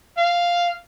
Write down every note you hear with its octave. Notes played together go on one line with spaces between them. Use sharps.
F5